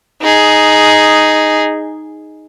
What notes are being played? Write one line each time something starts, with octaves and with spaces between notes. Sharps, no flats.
D#4 G#4